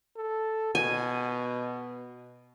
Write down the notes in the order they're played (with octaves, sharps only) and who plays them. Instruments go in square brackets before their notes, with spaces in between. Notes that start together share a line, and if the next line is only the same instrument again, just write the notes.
[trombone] A4
[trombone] B2 [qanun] G#5